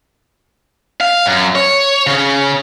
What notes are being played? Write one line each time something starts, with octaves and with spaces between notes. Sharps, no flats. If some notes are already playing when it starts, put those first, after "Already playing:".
F5
F#2
C#5
C#3